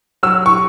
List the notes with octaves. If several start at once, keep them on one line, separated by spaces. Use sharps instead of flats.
F#3 E6
C#6